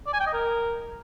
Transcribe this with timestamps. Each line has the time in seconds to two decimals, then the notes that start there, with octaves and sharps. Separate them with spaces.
0.06 D5
0.13 G#5
0.20 G5
0.27 D#5
0.34 A#4